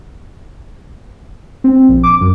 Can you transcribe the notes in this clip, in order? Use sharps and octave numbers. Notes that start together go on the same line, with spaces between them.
C4
A#1
D6
F#2